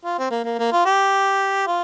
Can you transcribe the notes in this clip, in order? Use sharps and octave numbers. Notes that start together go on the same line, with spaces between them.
F4
C4
A#3
A#3
A#3
F4
G4
F4